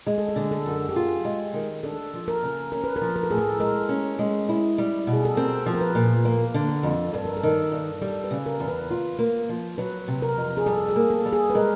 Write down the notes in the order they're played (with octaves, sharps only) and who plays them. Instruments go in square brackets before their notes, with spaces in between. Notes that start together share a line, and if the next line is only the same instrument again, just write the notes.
[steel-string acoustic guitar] G#3 [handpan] G#4
[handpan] A4
G#4
[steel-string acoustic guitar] D3
[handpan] A4
[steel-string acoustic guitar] F#2
[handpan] G4
[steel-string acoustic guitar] F4 [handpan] G#4
[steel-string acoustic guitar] G#3
D#3
[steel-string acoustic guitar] D4 [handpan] A4
[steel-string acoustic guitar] F3
[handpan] A#4
[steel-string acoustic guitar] C#3
[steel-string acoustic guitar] C#4 [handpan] A#4
[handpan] B4
A#4
[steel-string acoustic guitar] F3
[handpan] A#4
A4
[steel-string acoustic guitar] A2 [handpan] G#4
[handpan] A4
[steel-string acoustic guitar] G#3 [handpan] A#4
[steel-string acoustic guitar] C#4
G#3
E4
G3
B2
[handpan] G#4
A4
[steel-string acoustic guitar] C4 [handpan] A#4
[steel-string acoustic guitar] F3
[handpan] A#4
B4
[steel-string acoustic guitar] A#2
[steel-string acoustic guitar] A#3 [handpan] A#4
[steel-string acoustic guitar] D3
[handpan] A4
[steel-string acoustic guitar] F2
[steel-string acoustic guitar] G2 [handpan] A4
[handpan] A#4
A4
[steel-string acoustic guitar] D#3
G2
[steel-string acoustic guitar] G3 [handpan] A4
[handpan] B4
[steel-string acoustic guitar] C#3
[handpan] A#4
[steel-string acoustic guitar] E2
[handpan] B4
[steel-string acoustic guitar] F4
A#3
F3
[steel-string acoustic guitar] F#3 [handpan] B4
[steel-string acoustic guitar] C3
[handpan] A#4
[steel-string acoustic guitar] F2
[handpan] G#4
[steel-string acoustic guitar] G3 [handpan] A4
[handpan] G#4
[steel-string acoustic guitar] A#3
[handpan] A4
[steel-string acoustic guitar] G3
[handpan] G#4
B4
[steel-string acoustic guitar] G#3 [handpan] A#4